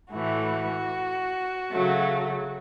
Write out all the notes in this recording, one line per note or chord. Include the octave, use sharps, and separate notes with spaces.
A2 E3 A3 F#4
C#3 F#3 A3